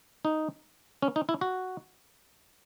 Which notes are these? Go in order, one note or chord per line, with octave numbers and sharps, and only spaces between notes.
D#4
C#4
D#4
E4
F#4